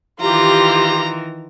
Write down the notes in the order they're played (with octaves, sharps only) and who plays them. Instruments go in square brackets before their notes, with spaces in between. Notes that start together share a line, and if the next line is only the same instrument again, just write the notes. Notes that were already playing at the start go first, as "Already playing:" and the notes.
[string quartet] D#3 E3 [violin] F4 [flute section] G4 [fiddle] A#5